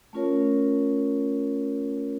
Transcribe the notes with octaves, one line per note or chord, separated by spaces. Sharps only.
A3 C#4 F4 A#4 C#5